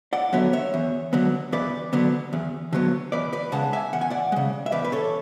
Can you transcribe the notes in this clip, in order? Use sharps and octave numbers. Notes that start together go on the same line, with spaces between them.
D5 F#5
D3 F#3 B3 C#5 E5
C#5 E5
E2
D3 F#3 B3
E2 B4 D5
D3 F#3 B3
E2
D3 F#3 B3
E2 B4 D5
B4 D5
C#3 G#3 F#5 A5
E5 G#5
E2 F#5
G#5
D5 F#5
G#3
C#3
E5
E2 B4 D5
B4
A4 C#5